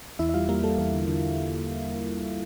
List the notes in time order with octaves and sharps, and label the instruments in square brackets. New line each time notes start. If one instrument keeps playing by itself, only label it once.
[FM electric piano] E2 E4 E5
E5
G3 F4 F5
G3 A#3 A#4
G3 A4
E2 A4
D3
D3